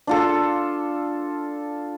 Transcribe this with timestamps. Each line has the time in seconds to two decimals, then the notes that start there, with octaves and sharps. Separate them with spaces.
0.07 D4 F4 A4